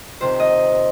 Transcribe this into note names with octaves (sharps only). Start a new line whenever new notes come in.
F2 C3 D#3 C5
D#5